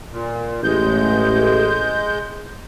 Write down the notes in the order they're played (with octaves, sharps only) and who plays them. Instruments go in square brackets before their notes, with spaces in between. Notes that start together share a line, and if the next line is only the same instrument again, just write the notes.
[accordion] A#2
[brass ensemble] A1 [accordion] G#3 G6